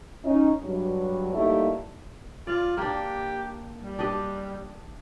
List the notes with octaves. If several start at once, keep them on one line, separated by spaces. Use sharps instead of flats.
C#4 D#4
G2 F#3
G3 A3 A#3 D#4 E4 G4
F4 D5
A#3 D4 G4
G3
D4 G4 D#5